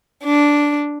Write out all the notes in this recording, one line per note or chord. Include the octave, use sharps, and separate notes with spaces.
D4